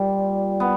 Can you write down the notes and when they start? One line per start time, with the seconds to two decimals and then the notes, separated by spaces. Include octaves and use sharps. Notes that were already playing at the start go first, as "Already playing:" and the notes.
Already playing: A#2 G3
0.60 B3